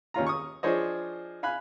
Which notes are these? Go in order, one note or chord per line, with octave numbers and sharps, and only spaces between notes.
D#2 C#4 F4 A#5
C#6 D#6
F3 D4 G#4 C5 C#5 D#5
F5 G#5 B5 F#6